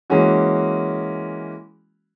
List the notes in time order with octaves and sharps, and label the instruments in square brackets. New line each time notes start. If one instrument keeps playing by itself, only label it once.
[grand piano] E3 G#3 A#3 C#4 F#4